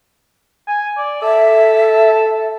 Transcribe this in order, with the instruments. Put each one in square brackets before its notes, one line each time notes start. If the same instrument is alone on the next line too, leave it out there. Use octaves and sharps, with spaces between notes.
[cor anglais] G#5
D5
[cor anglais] A4 [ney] E5